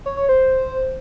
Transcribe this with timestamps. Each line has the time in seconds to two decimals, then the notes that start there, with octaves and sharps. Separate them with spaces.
0.06 C#5
0.17 C#5
0.29 C5